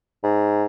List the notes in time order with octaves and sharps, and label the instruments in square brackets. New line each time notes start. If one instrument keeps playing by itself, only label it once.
[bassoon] G#2